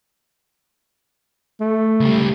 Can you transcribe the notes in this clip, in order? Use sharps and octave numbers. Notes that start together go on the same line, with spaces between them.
A3
C#2 G3